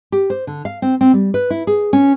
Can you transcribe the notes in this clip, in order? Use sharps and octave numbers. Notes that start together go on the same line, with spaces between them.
G4
C5
D3
F5
C4
C4
G3
B4
E4
G#4
C#4